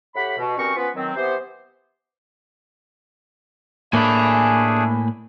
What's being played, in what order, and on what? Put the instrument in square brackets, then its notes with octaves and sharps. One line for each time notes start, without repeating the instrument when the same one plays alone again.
[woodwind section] A2 G4 F#5 B5
B2
G2 C4 C#4 F#4 A#4 C#6
F3 B3 C#4 F4 B4
D#3 F#3 C4
E3 B3 G4 C5
[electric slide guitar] A2 A#3 [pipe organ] A3 D4 G#4 [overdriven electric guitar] G#5 B5